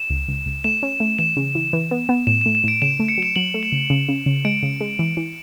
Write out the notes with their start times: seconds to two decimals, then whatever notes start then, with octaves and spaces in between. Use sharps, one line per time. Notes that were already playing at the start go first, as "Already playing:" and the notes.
Already playing: E7
0.10 C#2
0.28 C#2
0.46 C#2
0.64 A3 E7
0.83 C#4
1.00 A3
1.19 E3 E7
1.37 C#3
1.55 E3
1.73 E3
1.91 B3
2.09 B3
2.27 A2 E7
2.41 A2 E7
2.55 E7
2.64 A2 D7
2.82 C#3 E7
2.99 A3
3.08 C#7
3.18 F#3 E7
3.36 F#3 F#7
3.54 A3
3.63 E7
3.72 C#3
3.90 C#3
4.08 C#3
4.26 C#3
4.45 G#3 D7
4.63 C#3
4.81 G#3
4.99 E3
5.17 E3